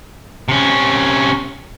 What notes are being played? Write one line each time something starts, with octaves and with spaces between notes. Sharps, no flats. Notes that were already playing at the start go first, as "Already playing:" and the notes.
C3 C#4